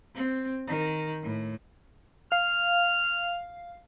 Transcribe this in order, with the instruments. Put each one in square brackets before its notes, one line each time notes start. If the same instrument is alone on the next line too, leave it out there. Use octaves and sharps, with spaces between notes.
[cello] C4
D#3
A2
[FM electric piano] F5 [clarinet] F6